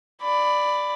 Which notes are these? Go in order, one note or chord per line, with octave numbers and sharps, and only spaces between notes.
D5 B5